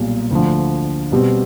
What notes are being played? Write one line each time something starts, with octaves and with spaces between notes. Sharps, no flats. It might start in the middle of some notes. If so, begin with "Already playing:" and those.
Already playing: B1 A#2 G3
D2 D3 F3
B2 G3 C4